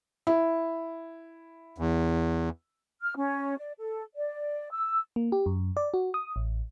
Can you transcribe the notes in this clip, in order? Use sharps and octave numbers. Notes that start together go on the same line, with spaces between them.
E4
E2
F6
C#4
D5
A4
D5
E6
A#3
G4
F#2
D5
F#4
D#6
A1